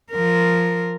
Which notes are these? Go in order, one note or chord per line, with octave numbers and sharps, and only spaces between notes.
F3 A#4